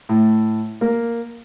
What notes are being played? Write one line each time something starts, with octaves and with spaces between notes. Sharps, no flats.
A2
A#3